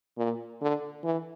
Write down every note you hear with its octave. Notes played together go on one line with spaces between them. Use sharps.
A#2
D3
E3